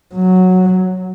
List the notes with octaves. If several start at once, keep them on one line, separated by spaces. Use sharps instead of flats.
F#3